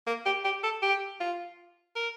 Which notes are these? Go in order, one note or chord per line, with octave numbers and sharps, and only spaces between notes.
A#3
G4
G4
A4
G4
F4
A#4